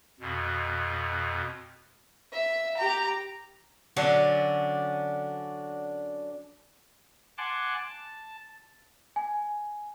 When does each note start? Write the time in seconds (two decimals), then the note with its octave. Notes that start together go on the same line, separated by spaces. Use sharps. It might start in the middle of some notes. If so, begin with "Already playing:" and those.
0.20 F2 B2
2.33 E5
2.77 G4 A#5
3.96 D3 F#3 C#4 D4
7.38 F#5 G#5 A5 C6 D6 F#6
7.78 A5
9.16 G#5